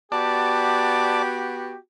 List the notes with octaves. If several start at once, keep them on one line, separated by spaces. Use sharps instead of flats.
B3 F#4 G4 D5 A5